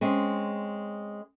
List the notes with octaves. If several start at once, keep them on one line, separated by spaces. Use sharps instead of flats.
G#3 C4 C#4